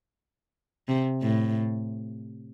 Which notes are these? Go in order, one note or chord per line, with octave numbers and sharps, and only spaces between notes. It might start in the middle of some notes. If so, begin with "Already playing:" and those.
C3
A2